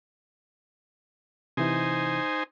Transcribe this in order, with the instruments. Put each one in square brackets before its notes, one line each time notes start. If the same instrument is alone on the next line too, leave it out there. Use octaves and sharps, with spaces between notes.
[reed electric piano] C3 E3 E4 [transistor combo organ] D#4 C5 G#5